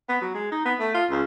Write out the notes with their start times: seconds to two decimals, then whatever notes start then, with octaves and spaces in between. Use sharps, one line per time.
0.09 B3
0.21 F#3
0.35 G#3
0.52 D#4
0.65 B3
0.80 A3
0.94 F4
1.11 C#2